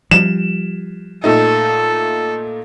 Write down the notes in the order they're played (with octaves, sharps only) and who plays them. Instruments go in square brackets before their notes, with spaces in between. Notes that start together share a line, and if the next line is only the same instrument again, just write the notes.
[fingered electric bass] F3 G3 [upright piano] E7
[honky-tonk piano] A#2 A3 D#4 [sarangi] A4